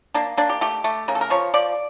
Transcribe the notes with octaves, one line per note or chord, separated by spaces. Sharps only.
A#3 D4
A#3 D4
G4
A3 G4
A3
C#3 A#4
A4
A#4
F3 C#5
F3 D5